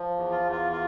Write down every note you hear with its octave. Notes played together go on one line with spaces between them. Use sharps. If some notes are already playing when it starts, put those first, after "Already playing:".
Already playing: F3
E2
F4
E2
F4
F4